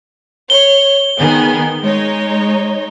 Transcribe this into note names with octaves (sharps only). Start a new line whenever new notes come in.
C#5 G7
D#3 B3 G#4
G#3 D#4 C#5